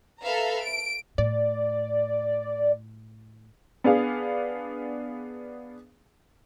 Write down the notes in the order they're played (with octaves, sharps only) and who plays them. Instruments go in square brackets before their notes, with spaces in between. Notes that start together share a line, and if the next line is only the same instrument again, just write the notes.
[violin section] A4 B4 E5 F5 A#5
D7
[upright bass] A2 [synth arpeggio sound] D5
[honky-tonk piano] B3 D4 G#4 F5